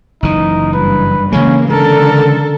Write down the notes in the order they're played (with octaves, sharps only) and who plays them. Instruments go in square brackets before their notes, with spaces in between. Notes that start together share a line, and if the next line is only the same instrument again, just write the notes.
[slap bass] F#1 E3 [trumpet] D#4
[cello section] G2 [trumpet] B4
[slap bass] C#3 E3 G#3 [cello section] A#3 [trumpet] C#4
[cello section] D3 A4 [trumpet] A#4